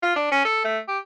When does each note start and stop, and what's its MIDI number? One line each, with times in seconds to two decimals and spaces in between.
0.03 0.12 65
0.16 0.27 62
0.32 0.40 61
0.45 0.62 69
0.64 0.78 57
0.88 0.98 67